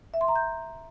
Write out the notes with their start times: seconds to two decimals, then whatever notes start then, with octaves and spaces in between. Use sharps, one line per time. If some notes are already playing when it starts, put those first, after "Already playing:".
0.14 E5
0.21 C6
0.28 A#5
0.36 G6